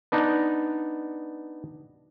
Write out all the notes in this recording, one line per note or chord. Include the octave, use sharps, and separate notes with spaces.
B3 D4 D#4